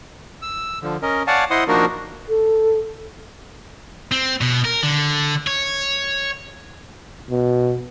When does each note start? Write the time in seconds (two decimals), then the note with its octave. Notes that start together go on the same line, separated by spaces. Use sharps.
0.42 E6
0.82 D3 F3
1.02 C#4 A#4 D#5
1.27 C#5 D5 F5 F#5 G#5 A5
1.51 E4 C5 D#5 F#5 C6 D#6
1.68 F3 A#3 D4 D#4 F#4 A#4
2.29 A4
4.12 C4
4.41 B2
4.65 A#4
4.83 D3
5.47 C#5
7.31 B2